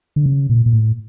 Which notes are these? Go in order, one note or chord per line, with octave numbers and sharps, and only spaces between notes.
D3
C#3
A#2
A#2
A2